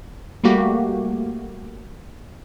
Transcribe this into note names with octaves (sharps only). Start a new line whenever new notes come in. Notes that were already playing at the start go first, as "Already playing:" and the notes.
G3 A3 A#3 F#4 G4